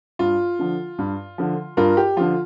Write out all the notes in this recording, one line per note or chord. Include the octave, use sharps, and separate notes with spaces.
G2 F4
D3 F3
G2
D3 F3
G2 F4 A#4
G4
D3 F3 F4